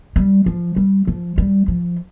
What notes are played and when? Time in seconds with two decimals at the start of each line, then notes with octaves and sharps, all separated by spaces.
0.16 G3
0.46 F3
0.76 G3
1.07 F3
1.38 G3
1.68 F3